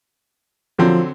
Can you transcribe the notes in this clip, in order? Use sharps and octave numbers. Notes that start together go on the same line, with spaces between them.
D3 F3 F#3 C4